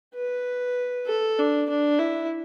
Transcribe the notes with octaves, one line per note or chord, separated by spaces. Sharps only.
B4
A4
D4
D4
E4